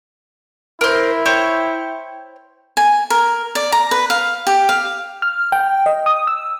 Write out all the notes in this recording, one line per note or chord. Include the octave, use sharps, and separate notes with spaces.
E4 A#4 C5
C5 C#5 G5
G#5
A#4
D5
A#5
B4
F5
G4
F5
F6
G5
D#5
D#6
E6